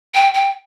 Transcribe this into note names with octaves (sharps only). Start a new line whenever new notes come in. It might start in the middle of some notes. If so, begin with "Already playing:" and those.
G5
G5